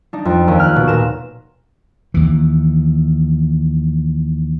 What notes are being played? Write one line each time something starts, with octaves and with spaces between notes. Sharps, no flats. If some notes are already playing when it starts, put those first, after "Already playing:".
D4 D#4
F2
D#2
F6 F#6
B2
A#2 A#4 E7
D#2 E3